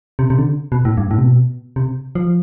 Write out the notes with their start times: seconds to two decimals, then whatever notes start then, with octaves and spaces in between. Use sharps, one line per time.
0.19 C3
0.30 C3
0.38 D3
0.72 B2
0.85 A2
0.97 G2
1.11 A2
1.18 C3
1.24 B2
1.76 C3
2.15 F3